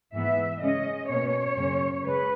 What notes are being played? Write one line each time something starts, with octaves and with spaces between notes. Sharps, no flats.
G#2 E3 B3 E5
C#3 G#3 C#4 D#5
B2 A#3 C#4 C#5
F#2 C#3 F#3 A#3 C#4
C#3 G#3 B4